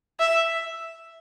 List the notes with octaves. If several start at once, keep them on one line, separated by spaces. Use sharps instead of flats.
E5